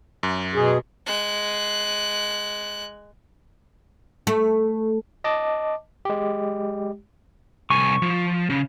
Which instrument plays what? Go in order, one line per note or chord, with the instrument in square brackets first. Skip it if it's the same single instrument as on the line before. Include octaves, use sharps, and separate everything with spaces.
[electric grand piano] F#2
[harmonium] B2 G#4
[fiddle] G#3 F#6
[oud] A3
[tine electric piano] D#5 A5 D6
G#3 G4
[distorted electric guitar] C2 G#5 [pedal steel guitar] C#6
[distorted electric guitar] F3
C#3